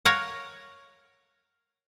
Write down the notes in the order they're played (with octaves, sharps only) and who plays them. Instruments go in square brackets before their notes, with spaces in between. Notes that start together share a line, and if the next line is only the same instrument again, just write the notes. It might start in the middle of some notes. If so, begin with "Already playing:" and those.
[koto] A#4 C#5 F5 F#5